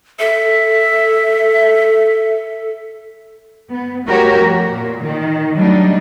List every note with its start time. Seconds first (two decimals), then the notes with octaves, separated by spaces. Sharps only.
0.19 A4 E5
3.70 B3
4.06 G3 A3 F#4 G4 A#4 C#5
4.37 F2
4.71 A#2
5.04 D#3
5.55 F#3 G3 A3 D4 D#4